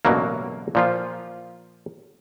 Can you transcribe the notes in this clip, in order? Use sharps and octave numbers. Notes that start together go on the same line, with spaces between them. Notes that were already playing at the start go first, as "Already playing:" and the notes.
A1 F#2 B2 D3 F#3 A#3
A#2 F3 F4